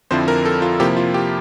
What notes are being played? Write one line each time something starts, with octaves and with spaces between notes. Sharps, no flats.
F2 D3 F3 C4 E4 C5
A#4
A4
F4
C3 F3 A#3 E4 G4
F4
G4